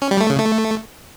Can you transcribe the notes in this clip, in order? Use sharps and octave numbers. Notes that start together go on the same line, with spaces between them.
C#4
G3
A3
C#3
A3